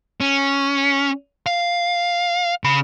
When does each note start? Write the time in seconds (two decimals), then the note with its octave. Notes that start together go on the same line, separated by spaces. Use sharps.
0.20 C#4
1.46 F5
2.64 C#3 B5